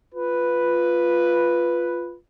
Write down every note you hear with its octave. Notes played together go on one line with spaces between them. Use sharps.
F4 B4